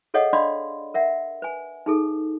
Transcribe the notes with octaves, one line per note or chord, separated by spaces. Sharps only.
G#4 A4 C#5 D#5 F5 F#5
D4 D5 D#5 F5 B5 C6
A#4 E5 F#5
B4 G#5
D#4 G#4 A4